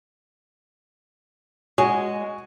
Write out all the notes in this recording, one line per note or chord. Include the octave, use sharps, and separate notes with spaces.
G#3 F#4 C#5 G#5